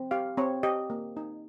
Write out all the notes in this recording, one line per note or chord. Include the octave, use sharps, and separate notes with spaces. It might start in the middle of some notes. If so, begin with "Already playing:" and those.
Already playing: C4
G4 F5
C4 C#5
G4 D#5
A#3
D#4